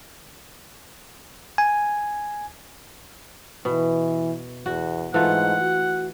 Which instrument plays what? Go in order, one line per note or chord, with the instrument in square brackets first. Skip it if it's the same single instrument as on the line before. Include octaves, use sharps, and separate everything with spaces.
[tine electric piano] G#5
[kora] B2 [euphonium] E3
[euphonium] E2 [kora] F#4
[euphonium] G#2 [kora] E3 A3 F4 [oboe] F#5
[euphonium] F#4